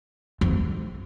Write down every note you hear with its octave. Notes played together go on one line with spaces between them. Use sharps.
F2